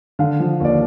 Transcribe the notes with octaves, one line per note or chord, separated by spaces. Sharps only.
D3 F5
F3
D#2 D5